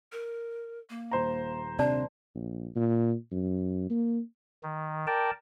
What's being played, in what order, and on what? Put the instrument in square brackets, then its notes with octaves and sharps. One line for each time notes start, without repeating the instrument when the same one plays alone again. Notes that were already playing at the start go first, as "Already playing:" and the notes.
[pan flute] A#4
A#3
[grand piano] D#1 C5 A#5
[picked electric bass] C3 [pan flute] D4 [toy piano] D5 A5
[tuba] A#1
A#2
F#2
A#3
[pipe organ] D#3
A#4 D5 G5 A5